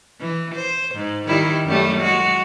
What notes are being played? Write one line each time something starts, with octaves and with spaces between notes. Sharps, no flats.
E3
C5
G#2
D#3 G3 E4
F#2 G3 A3
G#3 F#4